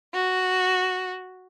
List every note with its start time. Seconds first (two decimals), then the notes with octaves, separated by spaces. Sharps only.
0.14 F#4